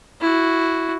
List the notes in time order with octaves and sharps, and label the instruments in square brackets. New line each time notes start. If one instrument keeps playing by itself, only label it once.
[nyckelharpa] E4 F#4